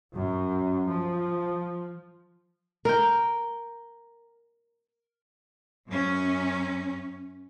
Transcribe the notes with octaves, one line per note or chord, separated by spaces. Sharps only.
F#2
F3
A#4 G5
F#2 C#4